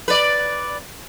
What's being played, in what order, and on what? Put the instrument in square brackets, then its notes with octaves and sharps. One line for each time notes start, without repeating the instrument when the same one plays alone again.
[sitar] B4 D5